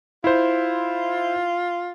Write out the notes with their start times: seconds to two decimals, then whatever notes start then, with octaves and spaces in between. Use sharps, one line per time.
0.24 E4 F4 C5